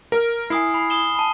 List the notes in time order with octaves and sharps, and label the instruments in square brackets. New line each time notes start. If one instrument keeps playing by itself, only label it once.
[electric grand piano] A#4 [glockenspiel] F6
[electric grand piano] E4 [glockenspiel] G#5 D#6 C7
[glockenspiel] B5 C7
D#6 E7 G7
A5 B5